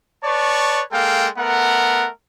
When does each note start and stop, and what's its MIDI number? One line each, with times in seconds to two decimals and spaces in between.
0.24 0.82 71
0.24 0.82 73
0.24 0.82 74
0.24 0.82 81
0.24 0.82 85
0.92 1.27 56
0.92 1.27 58
0.92 1.27 69
0.92 1.27 77
0.92 1.27 79
1.38 2.08 57
1.38 2.08 59
1.38 2.08 70
1.38 2.08 78